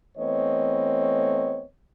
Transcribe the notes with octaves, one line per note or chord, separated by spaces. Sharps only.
E3 A3 B3 C4 C#5 D#5